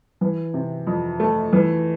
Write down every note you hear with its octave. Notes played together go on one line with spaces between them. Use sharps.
E3
C3
F2
A3
E3